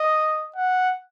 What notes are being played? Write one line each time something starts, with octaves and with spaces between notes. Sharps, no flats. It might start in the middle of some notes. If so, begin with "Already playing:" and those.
Already playing: D#5
F#5